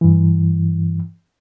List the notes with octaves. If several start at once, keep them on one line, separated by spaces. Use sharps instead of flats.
G2 E3